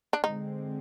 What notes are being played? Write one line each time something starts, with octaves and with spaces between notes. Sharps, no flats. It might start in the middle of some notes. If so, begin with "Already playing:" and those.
D4
D3 G#3 C4 D#4